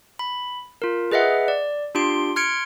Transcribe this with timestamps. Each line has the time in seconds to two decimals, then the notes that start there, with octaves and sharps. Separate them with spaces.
0.19 B5
0.82 F4 A#4
1.12 G#4 B4 D#5 E5 F#5
1.48 D5
1.95 D4 F4 G4 C6 D7
2.36 C6 F6 G#6 C#7 D7